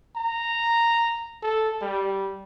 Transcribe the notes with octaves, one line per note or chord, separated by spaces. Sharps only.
A#5
A4
G3